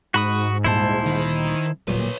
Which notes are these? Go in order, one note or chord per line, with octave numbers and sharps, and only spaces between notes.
G#2 F#4 B5 D#6
D2 A#2 G3 E4 C5 A5
D#3
D1 A#2 F#3 G3 B4 C#5